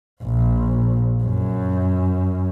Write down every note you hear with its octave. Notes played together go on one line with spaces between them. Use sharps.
A#1
F#2